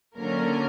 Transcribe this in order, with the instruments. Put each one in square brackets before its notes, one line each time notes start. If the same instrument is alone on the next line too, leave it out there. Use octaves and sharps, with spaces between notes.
[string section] D3 F#3 A#3 C#4 A#4